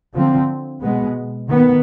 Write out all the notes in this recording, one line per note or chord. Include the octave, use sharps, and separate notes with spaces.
D3 F3 C4
B2 G#3 B3
D#3 B3